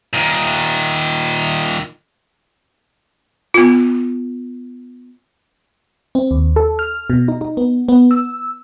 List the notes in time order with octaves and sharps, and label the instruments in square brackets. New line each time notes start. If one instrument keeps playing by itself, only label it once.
[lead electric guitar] A#2 D#3
[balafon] B3 F4
[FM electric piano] C4
D#2
A4
F6
B2
D#4
D#4
B3
B3
E6